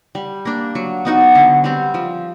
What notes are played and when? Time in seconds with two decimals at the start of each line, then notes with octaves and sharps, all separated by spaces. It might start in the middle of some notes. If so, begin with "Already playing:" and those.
0.15 G3
0.45 A#3 D4
0.75 F#3
1.05 B3 D#4 F#4
1.35 D3
1.64 G3 C4
1.94 F3